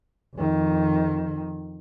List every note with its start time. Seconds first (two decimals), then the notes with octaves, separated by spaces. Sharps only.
0.36 F2 D#3